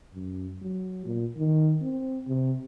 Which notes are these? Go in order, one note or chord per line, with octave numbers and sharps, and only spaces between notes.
F#2
F#3
A#2
D#3
C4
C3